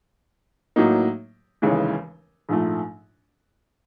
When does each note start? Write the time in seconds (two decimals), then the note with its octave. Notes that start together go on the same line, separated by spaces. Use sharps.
0.76 A2 F#3 A#3 D#4
1.62 F1 D#2 C#3 E3 G#3
2.49 A#1 G#2 F3 A3